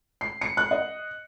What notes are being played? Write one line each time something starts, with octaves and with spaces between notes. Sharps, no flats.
C7
C#7
F#6
D#5